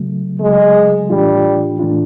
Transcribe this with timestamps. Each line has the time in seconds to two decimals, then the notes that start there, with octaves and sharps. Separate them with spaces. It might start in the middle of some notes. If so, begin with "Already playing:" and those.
Already playing: C#3 F#3 A3
0.40 C#3 F#3 G#3 A3
1.10 A2 E3 G3 A3 D4 F4
1.79 A2 E3 A3 D4 F4